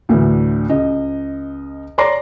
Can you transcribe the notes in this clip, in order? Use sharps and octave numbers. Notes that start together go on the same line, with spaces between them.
D2 A2 D3 E3
C#2 D#5
C#5 D5 A#5 C6 D6 A#6